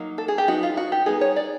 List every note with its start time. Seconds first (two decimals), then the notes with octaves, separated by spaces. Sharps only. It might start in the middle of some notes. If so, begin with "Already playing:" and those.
Already playing: F#3 A#3 D#4
0.18 A4
0.28 G#4
0.38 G4
0.48 F#3 B3 D#4 F#4
0.63 F4
0.77 F#4
0.92 G4
1.06 G3 B3 D#4 G#4
1.21 C#5
1.36 D5